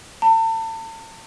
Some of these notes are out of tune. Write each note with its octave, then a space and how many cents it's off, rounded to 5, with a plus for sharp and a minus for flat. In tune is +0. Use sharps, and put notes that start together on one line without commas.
A5 +40